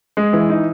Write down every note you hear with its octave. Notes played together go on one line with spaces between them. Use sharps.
G#3
E3
D#4